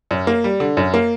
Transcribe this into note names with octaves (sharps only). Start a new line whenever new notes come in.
F#2
A#3
G3
D3
F#2
A#3